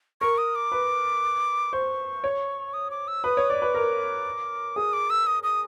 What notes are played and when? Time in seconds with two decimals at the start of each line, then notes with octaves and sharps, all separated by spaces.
0.21 A#4 C#6
0.38 D#6
0.55 D6
0.72 B4
1.73 C5 C#6
2.24 C#5
2.74 D#6
2.91 D6
3.08 E6
3.24 B4 D#6
3.37 C#5
3.50 D5 D6
3.62 B4
3.74 A#4
4.76 G#4 D#6
4.93 D6
5.10 E6
5.27 D#6
5.43 D#6